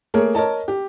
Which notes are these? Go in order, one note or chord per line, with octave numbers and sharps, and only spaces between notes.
A3 A#3 G#4 A#4 C#5
A#4 C#5 D#5 A5
G4